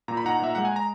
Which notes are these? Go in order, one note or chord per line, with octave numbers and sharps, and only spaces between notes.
A#2 A#5
B5
D#4 F#5 A#5
A#2 E5
G#3 F#5
G#5
A#5